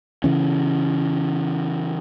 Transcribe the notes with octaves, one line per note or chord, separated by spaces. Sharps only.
C#3 E3 C#4